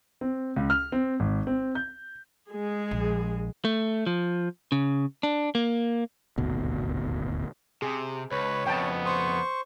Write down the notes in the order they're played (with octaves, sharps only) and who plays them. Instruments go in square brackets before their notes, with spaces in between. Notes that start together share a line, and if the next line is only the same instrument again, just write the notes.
[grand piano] C4
C#2
F6
C4
G#1
C4
G6
[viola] G#3 G#4
[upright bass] A#1
[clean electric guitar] A3
F3
C#3
D4
A#3
[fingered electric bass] D#1 G#1 D2 B2
[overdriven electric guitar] C3 [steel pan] G#4
[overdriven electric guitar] C#2 [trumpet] B4 [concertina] C#5
[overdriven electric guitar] F2 C#3 [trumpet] B3 [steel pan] G5 A5
[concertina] C5 C#6 [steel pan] D#6